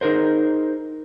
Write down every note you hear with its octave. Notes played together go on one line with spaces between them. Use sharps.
D#4 G#4 A#4 C5